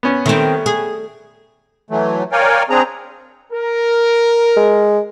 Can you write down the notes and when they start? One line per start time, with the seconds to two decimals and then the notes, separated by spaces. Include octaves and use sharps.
0.03 B3 C#4
0.26 D#3 G3 A3 C4
0.66 G#4
1.90 E3 F#3 A3
2.32 A#4 C#5 D5 F5 G5 G#5
2.70 C4 D4 G#4 A#5
3.53 A#4
4.56 G#3